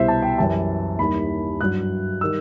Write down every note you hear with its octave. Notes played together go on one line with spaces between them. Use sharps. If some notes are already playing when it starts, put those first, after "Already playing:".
Already playing: C2 B2 G3 C5 E5
A5
G5
F#2 E3 G3 A5
D#2 D#3 G3 B5
G2 F#3 F#6
D#3 G3 E6